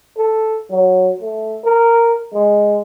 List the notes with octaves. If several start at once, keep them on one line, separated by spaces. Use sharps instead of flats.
A4
F#3
A3
A#4
G#3